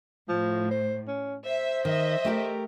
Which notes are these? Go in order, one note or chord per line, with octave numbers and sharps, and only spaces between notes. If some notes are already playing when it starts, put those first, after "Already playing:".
A2 F3
C5
C#4
C5 E5
D#3 D#5 E5
A3 G4 A#4